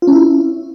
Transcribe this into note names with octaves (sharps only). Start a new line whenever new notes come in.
F4
C#4
E4